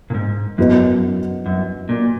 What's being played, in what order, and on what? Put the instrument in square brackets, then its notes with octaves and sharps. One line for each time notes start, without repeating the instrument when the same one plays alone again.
[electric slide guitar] A#2
G#2
[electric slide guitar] F#2 [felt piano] F#3 B3 F#4 B4 D#5
[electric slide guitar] F#2
A#2